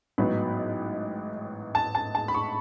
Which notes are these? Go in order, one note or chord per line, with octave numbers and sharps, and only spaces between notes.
A1 G#2 F#3 B3 D#4 B5
A5
A5
A5
B5
C#6